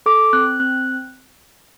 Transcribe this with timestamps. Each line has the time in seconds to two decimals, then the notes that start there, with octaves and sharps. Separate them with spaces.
0.06 A4 D6
0.33 C4 F#6
0.60 C4 F#6